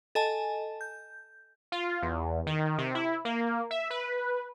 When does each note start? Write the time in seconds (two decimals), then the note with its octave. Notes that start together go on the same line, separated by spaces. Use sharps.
0.15 A4 D#5 G#5 A5
0.81 G6
1.72 F4
2.02 E2
2.47 D#3
2.78 C3
2.95 E4
3.25 A#3
3.71 E5
3.90 B4